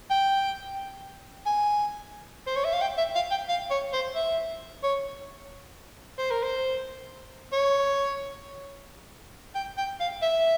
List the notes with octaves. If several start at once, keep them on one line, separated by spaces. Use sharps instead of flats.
G5
G#5
C5
C#5
E5
F5
G5
E5
F5
G5
F5
C#5
C5
E5
C#5
C5
A#4
C5
C#5
G5
G5
F5
E5